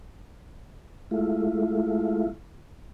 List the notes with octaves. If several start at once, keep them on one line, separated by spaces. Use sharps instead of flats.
G#3 A3 E4 F4